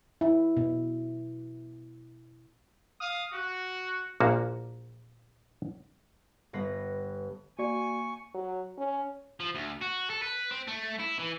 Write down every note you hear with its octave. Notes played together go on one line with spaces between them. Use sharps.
E4
B2
F5 D#6
F#4
A#1 A#2 A#3 F#4
G1 B3 B4 A#6 C7
A#3 F#4 D5 G#5 C#6
F#3
C#4
F3
D2
F#4
A4
B4
C4
A3
E4
E3